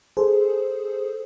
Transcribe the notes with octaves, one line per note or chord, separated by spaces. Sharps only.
G#4 A4 C5